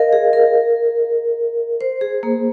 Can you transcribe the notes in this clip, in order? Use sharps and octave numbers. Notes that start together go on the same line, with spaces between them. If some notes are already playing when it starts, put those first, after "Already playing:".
Already playing: A#4 D#5 F5
G#4
A#4
C5
G#4
A#3